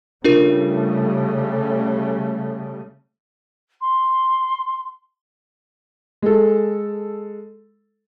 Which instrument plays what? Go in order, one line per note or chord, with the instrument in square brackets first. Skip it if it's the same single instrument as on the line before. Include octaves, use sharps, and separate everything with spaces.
[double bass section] C#3 G3 A3 [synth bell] D4 F4 A#4
[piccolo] C6
[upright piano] G#3 A4